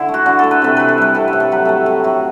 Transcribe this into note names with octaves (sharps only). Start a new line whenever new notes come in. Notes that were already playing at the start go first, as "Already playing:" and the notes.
Already playing: D3 E4
A3
F#4
D3
A3 A4
B4
C3 A4
E3 B4
A4
G3 B4
C3 A4
B4
A2
A4
F#3 B4
A3 A4
A2
A2 F#4